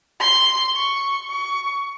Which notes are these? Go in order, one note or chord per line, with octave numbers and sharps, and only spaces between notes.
C6
C#6
C#6